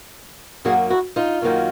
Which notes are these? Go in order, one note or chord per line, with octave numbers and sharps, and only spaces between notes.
F#2 D#3 F#3 A#3 C#4 F#4 G#4
E4 F#4
D#4 F4
F#2 D#3 F#3 A#3 C#4